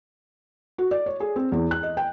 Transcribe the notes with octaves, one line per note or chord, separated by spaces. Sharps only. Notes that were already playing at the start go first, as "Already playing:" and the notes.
F#4
D5
C#5
G#4
C4
E2
F#6
D#5
G5